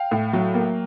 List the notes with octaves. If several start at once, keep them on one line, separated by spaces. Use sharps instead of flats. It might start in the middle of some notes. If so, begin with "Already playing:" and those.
Already playing: F5 G5
A2
F#3
A#3